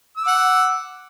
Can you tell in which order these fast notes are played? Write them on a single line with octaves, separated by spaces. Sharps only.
E6 D6 F#5